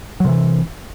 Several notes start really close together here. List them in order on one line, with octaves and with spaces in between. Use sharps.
F#3 C3 E3